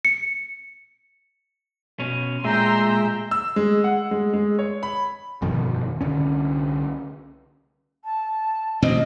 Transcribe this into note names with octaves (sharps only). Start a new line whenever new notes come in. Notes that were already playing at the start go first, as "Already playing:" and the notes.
C#7
B2 C#4
A#2 G#3 E5 G5 A#5 C6
E6
G#3
F#5
G#3
G#3
C#5
B5
G1 F2 B2 D#3
C2 D3 C#4
A5
A1 B2 C4 D#5